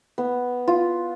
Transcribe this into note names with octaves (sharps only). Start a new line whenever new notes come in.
B3
F4